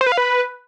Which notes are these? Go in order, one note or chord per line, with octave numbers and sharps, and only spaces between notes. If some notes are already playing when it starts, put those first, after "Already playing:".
C5
B4
F5
B4